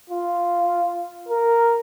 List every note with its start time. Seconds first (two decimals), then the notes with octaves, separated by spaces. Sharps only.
0.10 F4
1.29 A#4